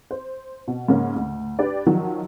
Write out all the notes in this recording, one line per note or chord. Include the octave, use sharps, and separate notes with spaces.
C5
B2
G#2 C#3 A#3 C#4
D2
D4 G4 B4 D5
D#3 F3 F#3